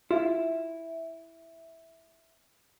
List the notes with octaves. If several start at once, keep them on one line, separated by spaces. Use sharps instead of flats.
E4 F4